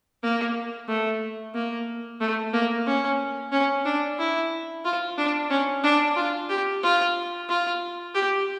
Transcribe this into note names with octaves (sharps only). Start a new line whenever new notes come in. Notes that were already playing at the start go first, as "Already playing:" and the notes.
A#3
A3
A#3
A3
A#3
C#4
C#4
D4
E4
F4
D4
C#4
D4
F4
G4
F4
F4
G4